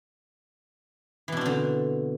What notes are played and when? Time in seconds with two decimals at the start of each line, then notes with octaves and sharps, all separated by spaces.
1.28 E3
1.32 B2
1.37 D4
1.41 C4
1.46 D3